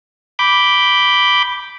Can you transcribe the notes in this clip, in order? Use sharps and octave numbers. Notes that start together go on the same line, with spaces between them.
B5 D6 G6